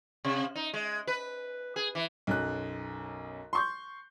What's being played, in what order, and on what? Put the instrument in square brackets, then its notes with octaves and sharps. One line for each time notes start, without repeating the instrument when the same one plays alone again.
[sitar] C3
D#4
G#3
B4
G#4
E3
[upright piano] B1 F#2 F#6
C6 C#6 G6